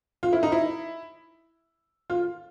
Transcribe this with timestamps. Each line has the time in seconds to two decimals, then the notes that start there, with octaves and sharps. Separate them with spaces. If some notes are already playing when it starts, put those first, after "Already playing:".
0.23 F4
0.33 E4
0.43 D#4
0.52 E4
2.10 F4